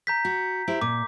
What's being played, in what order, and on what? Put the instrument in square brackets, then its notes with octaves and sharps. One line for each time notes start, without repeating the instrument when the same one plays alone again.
[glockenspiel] A#5 G6 B6
[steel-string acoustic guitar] F#4
E4 G4 C5
[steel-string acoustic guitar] A#2 [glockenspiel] D6